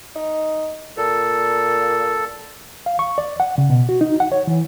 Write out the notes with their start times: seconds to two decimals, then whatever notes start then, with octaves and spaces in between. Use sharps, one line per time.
0.16 D#4
0.97 A#2 A4
2.86 F5
2.99 C#6
3.18 D5
3.40 F#5
3.58 C#3
3.70 B2
3.89 F#4
4.01 D#4
4.20 F#5
4.32 C#5
4.47 E3